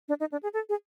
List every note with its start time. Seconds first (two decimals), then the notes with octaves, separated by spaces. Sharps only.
0.08 D4
0.20 D#4
0.32 D4
0.43 G#4
0.54 A4
0.69 G#4